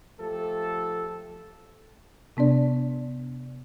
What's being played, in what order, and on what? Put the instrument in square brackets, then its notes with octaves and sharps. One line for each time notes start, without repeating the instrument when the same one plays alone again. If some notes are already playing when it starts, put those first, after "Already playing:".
[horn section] F3 A3 G4 A4
[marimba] C3 B3 D4 D5